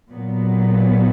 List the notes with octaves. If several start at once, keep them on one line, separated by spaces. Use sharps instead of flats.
A#2 F#3 B3